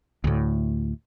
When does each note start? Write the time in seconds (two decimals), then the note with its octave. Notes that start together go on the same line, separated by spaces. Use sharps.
0.24 D2 A2